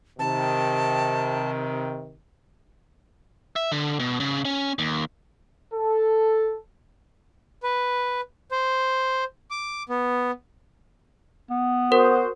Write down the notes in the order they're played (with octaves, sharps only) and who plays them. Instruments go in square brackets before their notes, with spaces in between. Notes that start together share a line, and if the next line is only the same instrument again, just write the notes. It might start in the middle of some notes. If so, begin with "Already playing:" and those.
[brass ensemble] C3 D#3 [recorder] A5
[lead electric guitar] E5
D3
B2
C#3
C#4
D#2
[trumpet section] A4
[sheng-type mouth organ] B4
C5
D6
B3
[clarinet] B3
[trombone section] F#4 C5 [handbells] A#4